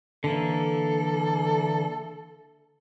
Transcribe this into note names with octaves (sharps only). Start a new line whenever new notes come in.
D3 E3 A#3 A4